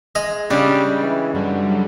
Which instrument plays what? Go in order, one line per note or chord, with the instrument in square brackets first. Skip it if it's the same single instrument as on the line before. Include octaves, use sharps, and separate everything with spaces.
[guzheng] G#3 [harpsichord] D#5
[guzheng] C#3 [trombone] G3 [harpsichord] D4
[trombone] E3
[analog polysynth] F#2 F#3 G3 [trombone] D3